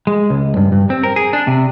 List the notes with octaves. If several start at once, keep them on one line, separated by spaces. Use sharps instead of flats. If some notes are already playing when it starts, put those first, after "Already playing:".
G#3
C#2
G2
G2
C4
A#4
G#4
D4
C3